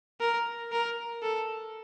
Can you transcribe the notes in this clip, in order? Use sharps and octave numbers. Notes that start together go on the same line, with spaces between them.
A#4
A#4
A4